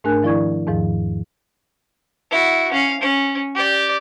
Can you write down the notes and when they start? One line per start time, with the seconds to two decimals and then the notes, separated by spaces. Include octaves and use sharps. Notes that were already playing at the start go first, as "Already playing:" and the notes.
0.04 G#2 A3 D4 A#4 G#5 F#6
0.23 D#3 F3 E4 D5 C#6 G#6
0.67 E2 G#2 D#3 F3
2.31 E4 F#4
2.72 C#4 F5
3.01 C#4
3.55 G4 D5